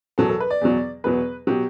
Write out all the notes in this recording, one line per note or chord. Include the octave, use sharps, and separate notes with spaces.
E2 B2 F#3 A4
A4
B4
D5
E2 B2 F#3
E2 B2 F#3 B4
B2 F#3 G4